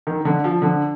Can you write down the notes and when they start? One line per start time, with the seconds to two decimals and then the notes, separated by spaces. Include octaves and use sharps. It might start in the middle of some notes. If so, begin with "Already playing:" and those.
0.07 D#3
0.25 D3
0.44 F3
0.62 D3